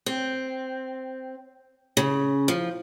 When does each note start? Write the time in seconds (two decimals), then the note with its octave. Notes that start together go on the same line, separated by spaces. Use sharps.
0.06 C4
1.97 C#3
2.48 F3